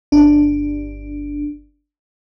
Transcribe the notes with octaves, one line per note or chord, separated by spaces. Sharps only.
G1 D4